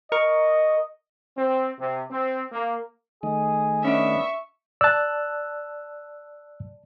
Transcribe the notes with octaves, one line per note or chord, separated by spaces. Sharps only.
A#4 D#5 C#6
C4
C3
C4
A#3
D#3 A3 G#4 D#5
B3 C#4 D4 E5 C#6
D5 A5 E6 F#6